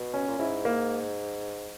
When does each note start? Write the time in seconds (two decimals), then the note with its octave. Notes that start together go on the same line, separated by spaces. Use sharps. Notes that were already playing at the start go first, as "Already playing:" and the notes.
Already playing: B2
0.14 C#4
0.28 A#2
0.39 G#2 E4
0.65 A#3